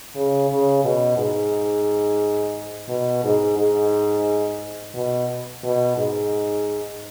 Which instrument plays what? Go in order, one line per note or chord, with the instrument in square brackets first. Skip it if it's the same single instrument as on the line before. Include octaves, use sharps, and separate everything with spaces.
[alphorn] C#3
C#3
B2
G#2
B2
G#2
G#2
B2
B2
G#2